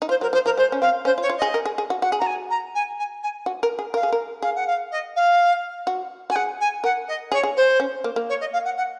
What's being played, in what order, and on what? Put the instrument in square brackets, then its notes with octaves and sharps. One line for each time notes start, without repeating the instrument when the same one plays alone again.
[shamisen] D#4
[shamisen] F4 [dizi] C5
[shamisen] F#3 [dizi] A#4
[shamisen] F3 [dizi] C5
[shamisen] F3 [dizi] A#4
[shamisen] G#3 [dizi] C5
[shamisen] C#4
[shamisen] C4 [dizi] F5
[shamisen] C#4 [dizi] C5
[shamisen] F4
[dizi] C#5
[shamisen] F4
[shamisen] G#4 [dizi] D#5
[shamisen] A#4
G#4
G#4
F#4
[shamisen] F#4 [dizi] F#5
[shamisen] G#4
[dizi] A#5
[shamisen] F#4 [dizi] G#5
[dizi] A#5
G#5
G#5
G#5
[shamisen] F#4
A#4
G#4
[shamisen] A#4 [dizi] F5
[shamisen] G#4
A#4
[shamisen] G#4 [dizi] F5
[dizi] F#5
F5
D#5
F5
[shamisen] F#4
[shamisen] F#4 [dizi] G#5
[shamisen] G#4 [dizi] F#5
[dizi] G#5
[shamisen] A#4 [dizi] F#5
[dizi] D#5
[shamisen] G#4 [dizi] C#5
[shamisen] G#4
[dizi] C5
[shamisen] C#4
A#3
A#3
[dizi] C#5
D#5
F5
F#5
F#5